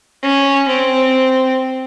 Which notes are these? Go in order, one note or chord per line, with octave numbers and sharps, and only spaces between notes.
C#4
C4